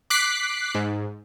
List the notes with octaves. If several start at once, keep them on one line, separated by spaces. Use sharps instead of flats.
D6 F#6 B6 C7
G#2